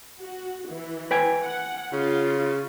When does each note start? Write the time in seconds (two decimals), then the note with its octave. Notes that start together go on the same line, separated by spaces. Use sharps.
0.20 F#4
0.68 E3
1.11 B4 G5 G#5
1.43 F#5
1.93 C#3 F4